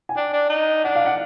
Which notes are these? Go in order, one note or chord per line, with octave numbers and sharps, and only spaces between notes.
G#5
D4 G5
D4
D#4
D4 F#5
F5
F#5